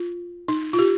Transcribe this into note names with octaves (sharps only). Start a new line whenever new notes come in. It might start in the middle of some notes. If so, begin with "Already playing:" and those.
Already playing: F4
D#4
F4
G4